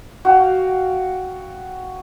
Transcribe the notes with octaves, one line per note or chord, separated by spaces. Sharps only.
F#4 F5 G5